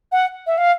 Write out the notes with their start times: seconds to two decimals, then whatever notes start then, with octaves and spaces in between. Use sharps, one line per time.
0.12 F#5
0.47 E5
0.58 F5